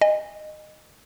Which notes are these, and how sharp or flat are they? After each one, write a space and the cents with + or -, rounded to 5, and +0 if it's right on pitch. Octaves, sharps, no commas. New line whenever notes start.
D#5 -20 G#5 -30